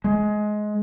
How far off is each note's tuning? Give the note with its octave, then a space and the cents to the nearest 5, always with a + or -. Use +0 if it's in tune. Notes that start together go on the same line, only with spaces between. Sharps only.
G#3 +20